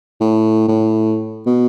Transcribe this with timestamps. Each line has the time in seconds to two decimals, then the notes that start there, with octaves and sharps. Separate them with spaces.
0.20 A2
0.68 A2
1.47 B2